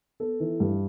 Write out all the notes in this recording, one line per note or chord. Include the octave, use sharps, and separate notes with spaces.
B3 A4
E3
G2